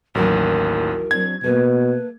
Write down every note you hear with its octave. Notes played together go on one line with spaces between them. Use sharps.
A1 D#2 E3 F#3 F#4 A#4
F#3 C4 D4 G#6
B2 A3 A#3 B4